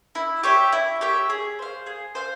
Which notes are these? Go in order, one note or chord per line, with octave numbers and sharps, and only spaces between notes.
E4
G4 C#5 E5
E4
G4 C#5 E5
G#4
C5 F5
G#4
C5 F5